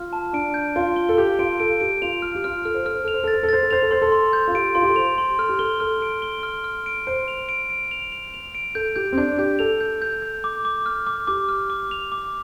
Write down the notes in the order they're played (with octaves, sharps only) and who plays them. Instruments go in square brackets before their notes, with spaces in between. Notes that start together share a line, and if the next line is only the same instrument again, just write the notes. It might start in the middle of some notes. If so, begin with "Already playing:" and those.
Already playing: [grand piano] F4 [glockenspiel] F6
[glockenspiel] A5
[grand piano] D4 [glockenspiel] D7
[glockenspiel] G6
[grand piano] F4 [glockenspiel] G6
[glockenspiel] G7
[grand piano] A4
[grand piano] G4 [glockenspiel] G6
[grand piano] F4 [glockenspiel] D7
[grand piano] A4 [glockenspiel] D7
[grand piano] G4 [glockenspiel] D7
[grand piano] F4 [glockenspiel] F7
[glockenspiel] F6
[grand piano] G4
[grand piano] F4 [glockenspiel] F6
[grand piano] A4 [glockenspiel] F6
[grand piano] C5
[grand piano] A4 [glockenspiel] F6
[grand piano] C5
[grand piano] A4 [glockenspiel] F7
[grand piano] C5
[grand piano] A4 [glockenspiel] A6
[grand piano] C5
A4
[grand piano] C5 [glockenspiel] A6
[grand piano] A4
[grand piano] C5 [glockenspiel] F7
[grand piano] A4
[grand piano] C5 [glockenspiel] C6
[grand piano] A4
[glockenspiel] C6
G6
[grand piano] F4
[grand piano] G4 [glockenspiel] D7
[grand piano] F4 [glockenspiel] C6
[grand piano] G4
A4
[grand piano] C5 [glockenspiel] F7
[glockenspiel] C6
[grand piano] A4 [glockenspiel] F6
[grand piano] G4
[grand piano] A4 [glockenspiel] G7
[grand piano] A4 [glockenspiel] F6
[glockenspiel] D7
G7
F6
F6
D7
[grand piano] C5 [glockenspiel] D7
[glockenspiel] F7
D7
D7
F7
F7
F7
D7
[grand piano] A4 [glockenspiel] G6
[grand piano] G4 [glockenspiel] G6
[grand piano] C4
[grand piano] D4 [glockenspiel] G6
[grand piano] G4 [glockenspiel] G6
[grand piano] A4 [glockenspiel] F7
[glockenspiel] G6
G6
G6
D6
D6
F6
D6
[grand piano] G4 [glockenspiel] D6
[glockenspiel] F6
D6
F7
D6